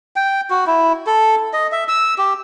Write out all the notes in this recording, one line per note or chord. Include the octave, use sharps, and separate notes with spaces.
G5
F#4
E4
A4
D#5
E5
E6
G4